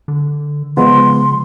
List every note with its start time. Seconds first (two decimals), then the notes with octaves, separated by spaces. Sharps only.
0.08 D3
0.77 C#3 F3 G#3 B3 C6